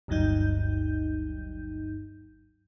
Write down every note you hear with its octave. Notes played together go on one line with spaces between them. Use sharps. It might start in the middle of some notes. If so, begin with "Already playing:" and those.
G1 D2 G2 F#3 D#4 G6